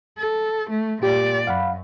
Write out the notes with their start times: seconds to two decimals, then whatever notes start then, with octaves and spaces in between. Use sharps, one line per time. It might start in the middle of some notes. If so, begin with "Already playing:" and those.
0.18 A4
0.70 A3
1.03 A#2 G4 D5
1.47 F#2 F5 F#5 B5